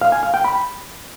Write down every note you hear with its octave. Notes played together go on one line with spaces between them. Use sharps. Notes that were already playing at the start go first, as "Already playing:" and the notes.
F5
G#5
F5
G5
B5